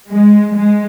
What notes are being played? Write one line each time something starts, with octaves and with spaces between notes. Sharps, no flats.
G#3
G#3